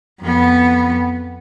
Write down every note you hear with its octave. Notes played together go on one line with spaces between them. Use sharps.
F2 B3